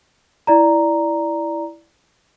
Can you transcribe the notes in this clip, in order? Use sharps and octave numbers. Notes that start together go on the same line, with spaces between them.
E4 D5 A#5